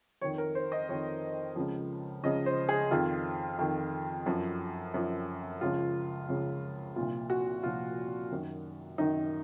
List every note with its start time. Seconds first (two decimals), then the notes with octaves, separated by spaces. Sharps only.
0.21 F2 C#5
0.25 D#3
0.38 A#4
0.55 C5
0.72 D#5
0.89 F2 D#3 C#5
1.56 C#2 C#3 F3
2.23 C#2 C#3 F3 D#5
2.46 C5
2.69 G#4
2.91 F2 D#3 F4
3.59 F2 D#3
4.26 F#2 F3
4.94 F#2 F3
5.61 C#2 C#3 F3 F4
6.29 C#2 C#3 F3
6.96 C2 A#2 F3 F4
7.30 F#4
7.63 C2 A#2 F3 F4
8.31 F#2 D#3
8.98 F#2 D#3 D#4